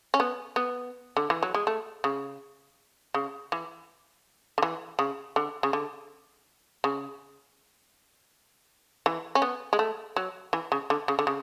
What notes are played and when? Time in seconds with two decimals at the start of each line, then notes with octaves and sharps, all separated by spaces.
0.14 C#4
0.20 B3
0.56 B3
1.17 D3
1.30 E3
1.43 F#3
1.54 G#3
1.67 A3
2.04 C#3
3.14 C#3
3.52 E3
4.58 D3
4.63 E3
4.99 C#3
5.36 D3
5.63 C#3
5.73 D3
6.84 C#3
9.06 E3
9.35 C#4
9.42 B3
9.73 G#3
9.79 A3
10.16 F#3
10.53 E3
10.72 C#3
10.90 D3
11.08 C#3
11.19 D3
11.27 C#3